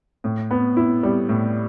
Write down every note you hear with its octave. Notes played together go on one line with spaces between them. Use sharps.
A2
B3
E4
G3
A2